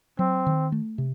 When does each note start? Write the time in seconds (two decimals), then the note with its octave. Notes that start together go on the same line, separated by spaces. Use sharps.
0.19 F#3 C4
0.46 D#3
0.72 A3
0.98 C3